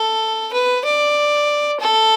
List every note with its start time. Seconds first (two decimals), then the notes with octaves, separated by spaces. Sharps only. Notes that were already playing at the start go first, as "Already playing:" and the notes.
Already playing: A4
0.53 B4
0.86 D5
1.80 A4